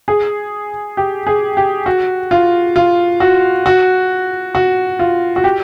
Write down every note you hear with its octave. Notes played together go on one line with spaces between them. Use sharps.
G#4
G4
G#4
G4
F#4
F4
F4
F#4
F#4
F#4
F4
F#4
G4